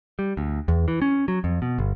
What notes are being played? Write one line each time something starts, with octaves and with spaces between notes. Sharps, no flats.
G3
D2
E2
E3
C#4
F#3
F2
B2
G1